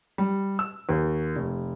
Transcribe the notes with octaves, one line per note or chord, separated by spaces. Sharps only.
G3
E6
D#2
F1